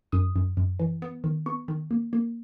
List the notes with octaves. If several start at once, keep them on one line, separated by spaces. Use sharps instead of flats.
F#2 D#6
F#2
F#2
E3
B3
D#3
B3 C#6
D#3
A#3
A#3